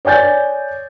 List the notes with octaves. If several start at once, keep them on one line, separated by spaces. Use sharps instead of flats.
C#5 D5 G#5 G6 A6